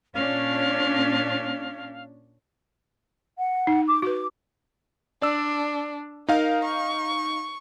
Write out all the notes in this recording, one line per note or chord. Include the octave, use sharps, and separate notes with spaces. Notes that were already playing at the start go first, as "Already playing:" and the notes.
A#2 C#4 D4 F5
F#5
D#4
D6
F#4 B4 D6
D4 D5 E6
D#4 A#4 F5
C#6